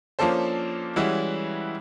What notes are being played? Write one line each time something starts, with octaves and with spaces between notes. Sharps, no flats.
F3 A#3 C#4 D4 A4 C5
E3 G3 G#3 C#4 E4 F#4